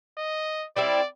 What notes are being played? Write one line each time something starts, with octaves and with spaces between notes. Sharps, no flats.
D#5
G3 C4 E4 D5